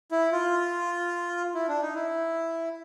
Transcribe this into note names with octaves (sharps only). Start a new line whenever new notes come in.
E4
F4
E4
D4
D#4
E4